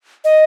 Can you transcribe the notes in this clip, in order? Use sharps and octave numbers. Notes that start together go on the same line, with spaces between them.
D#5